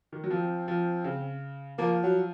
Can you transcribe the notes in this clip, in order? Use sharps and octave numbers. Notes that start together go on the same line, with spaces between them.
D#3
F#3
F3 C4
F3
C#3
F3 A#3
F#3